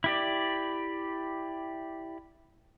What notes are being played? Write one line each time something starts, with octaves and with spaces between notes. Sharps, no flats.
E4 G4 D5